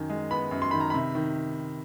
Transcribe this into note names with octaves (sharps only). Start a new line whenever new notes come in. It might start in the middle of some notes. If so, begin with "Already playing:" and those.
Already playing: F#2 D#3
G#3
B3 B5
F#2
C6
D#3 B5
A#5
C3 B5
D#3